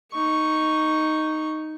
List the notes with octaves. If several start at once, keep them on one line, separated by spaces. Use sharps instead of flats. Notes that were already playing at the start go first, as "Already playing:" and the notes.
D#4 C#6